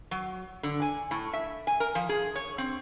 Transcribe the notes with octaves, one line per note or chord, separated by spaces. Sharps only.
F#3
D3
G#5
A2
E5
G#5
A#4
F3
G#4
C#5
C4